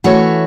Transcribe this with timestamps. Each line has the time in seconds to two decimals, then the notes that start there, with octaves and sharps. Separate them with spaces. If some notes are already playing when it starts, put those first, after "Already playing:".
0.04 E3 A3 C#4 F#4 C#5